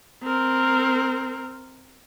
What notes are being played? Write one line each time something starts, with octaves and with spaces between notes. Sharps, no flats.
C4 A#4